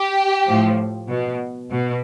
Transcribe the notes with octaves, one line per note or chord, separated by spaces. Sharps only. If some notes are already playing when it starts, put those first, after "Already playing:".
Already playing: G4
A2 F3
B2
B2